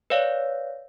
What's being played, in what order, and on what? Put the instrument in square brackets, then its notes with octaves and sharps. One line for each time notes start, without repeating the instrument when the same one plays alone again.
[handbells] B4 C#5 D5 F5